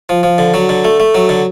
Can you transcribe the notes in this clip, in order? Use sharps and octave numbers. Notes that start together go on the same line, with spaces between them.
F3
F3
D3
F#3
D3
A3
A3
F#3
D3